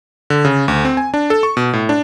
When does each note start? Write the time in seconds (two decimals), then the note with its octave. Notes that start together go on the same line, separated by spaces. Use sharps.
0.30 D3
0.45 C#3
0.68 D2
0.85 C4
0.97 G#5
1.14 D4
1.30 A4
1.43 C#6
1.57 B2
1.73 A2
1.89 D4